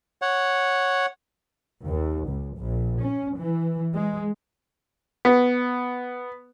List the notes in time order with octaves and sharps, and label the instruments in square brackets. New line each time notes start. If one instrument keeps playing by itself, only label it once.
[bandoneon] C#5 F#5
[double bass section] D#2
C#2
A#1
C#4
E3
G#3
[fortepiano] B3